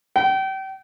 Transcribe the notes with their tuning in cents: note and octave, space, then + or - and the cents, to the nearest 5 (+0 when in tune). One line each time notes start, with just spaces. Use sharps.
G5 -35